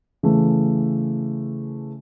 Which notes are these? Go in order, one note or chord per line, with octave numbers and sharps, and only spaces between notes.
C#3 E3 A3